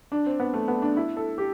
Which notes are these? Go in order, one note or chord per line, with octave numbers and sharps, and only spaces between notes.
D4
C4
B3
A3
B3
D4
E4
A4
G4